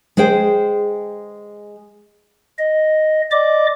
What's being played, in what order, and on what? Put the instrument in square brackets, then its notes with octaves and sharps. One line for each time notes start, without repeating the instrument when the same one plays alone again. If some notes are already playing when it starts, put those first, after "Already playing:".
[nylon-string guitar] G#3 G#4 C5 G5
[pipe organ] D#5
D5 D#5 D6